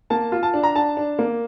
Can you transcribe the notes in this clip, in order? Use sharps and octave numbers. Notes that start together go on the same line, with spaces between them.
A#3 A5
F4
A5
D4
A#5
D4 A5
D4
A#3